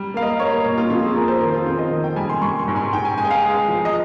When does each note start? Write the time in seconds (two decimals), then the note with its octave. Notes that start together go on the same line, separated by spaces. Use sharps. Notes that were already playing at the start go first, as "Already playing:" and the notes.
Already playing: G3
0.14 A#3 F5
0.22 D#5
0.39 A#3 C#5
0.52 A#4
0.65 A#2
0.78 F4
0.90 F2 F4
1.03 G#4
1.15 A#3 A#4
1.28 C5
1.41 D#3 A#4
1.53 F4
1.66 F2 F4
1.79 D#5
1.91 D#3
2.04 G5
2.16 G3 G#5
2.29 C6
2.42 G3 C#6
2.59 C6
2.68 G#2
2.76 G#5
2.92 G#2 G5
3.05 G#5
3.18 G#3 G#5
3.25 G5
3.31 F5
3.44 G#3
3.68 F3
3.85 D#5